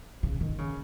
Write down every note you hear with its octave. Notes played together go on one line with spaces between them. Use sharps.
C#3
D#3
C#3